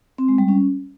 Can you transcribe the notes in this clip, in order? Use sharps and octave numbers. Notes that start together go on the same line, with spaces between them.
C4
G#3
G3
C#4